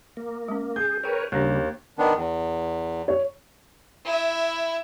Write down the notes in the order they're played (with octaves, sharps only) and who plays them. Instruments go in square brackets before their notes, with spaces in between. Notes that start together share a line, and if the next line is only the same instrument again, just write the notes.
[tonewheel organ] A#3
[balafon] G#3 C#4
[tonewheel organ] G#4 [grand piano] G6
[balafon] G#4 G5 [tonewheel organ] A#4 B4 C#5
[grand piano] D#2 [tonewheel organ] C#3 G3 [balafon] A#3 D4
[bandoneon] D#3 B3 D4
E2
[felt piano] C#5
[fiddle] E4 E5